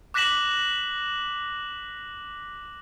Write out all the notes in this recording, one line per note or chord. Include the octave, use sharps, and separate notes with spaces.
D6 F#6 A#6 B6 E7 F#7